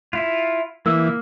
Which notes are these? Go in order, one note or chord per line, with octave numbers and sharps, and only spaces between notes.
E4 F4
E3 A#3 A#4 E6